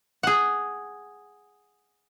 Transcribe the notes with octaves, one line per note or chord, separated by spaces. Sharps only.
G#4 F#5